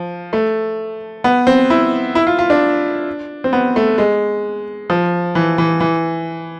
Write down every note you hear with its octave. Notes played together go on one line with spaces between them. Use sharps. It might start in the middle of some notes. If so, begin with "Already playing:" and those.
Already playing: F3
A3
B3
C4
E4
E4
F4
F4
D4
C4
B3
A3
G#3
F3
E3
E3
E3